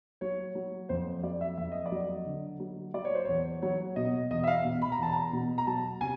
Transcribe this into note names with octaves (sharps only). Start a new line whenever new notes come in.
F#3 C#5
F#3
F2 C5
F#3 D5
E5
F2 E5
D#5
D5
F#3
D#5
D3
F#3
F#3 D5
C#5
C5
E2 C#5
F#3 C#5
B2 D#5
E2 D#5
E5
F5
B2
B5
A#5
E2 A5
A#5
B2
A#5
F#3 A5
C3 G#5